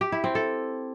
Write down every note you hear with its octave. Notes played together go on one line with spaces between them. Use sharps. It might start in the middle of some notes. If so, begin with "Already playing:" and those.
G4
E4
C4
A4